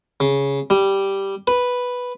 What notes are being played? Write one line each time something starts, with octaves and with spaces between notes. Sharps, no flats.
C#3
G3
B4